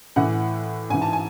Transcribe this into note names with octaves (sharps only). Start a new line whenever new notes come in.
A2 E3 F#5
G#2 E3 G#5
A5
G#5